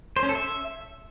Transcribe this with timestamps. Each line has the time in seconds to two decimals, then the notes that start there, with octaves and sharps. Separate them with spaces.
0.16 C5
0.23 C#4
0.29 A4
0.35 E5